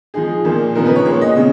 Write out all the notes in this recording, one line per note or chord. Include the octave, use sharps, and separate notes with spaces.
F3 G#3 D#4 G#4
A#2 F3 A#3 D#4
C#3 F3 B3 D#4 A#4
B4
C#5
A#2 G#3 B3 C#5
D#5
C#3